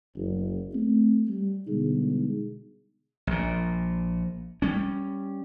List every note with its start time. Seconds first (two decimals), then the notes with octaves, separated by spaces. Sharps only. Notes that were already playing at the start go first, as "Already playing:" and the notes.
0.15 F#1
0.74 A3 C4
1.28 G3
1.67 B2 D3 G3 G#3 D#4 G#4
3.27 A#1 A#2
4.62 G3 C#4